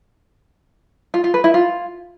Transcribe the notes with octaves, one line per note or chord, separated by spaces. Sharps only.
F4
F4
B4
E4
F4